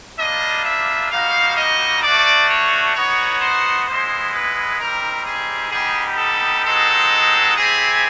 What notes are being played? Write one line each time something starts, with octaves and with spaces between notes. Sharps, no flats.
G3 A#3 D4 F4 D#5
E5
G3 A#3 D#4 F#4 F5
D#5
A3 D4 F#4 D5
C#5
B3 D#4 F#4 C#5
C5
G#3 B3 E4 C5
B4
G3 C4 D#4 G4 A#4
G#4
G3 B3 D#4 G4 G#4
A4
G#3 C4 D#4 F#4 A4
C4 E4 G4 G#4